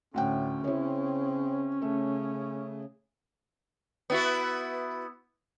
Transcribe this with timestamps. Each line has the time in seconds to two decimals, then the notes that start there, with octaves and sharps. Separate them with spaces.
0.14 D2 A2 D3 C#4 F#5 G5
0.64 C#3 C4 E4 C#5
1.82 C#3 A3
4.10 B3 E4 F#4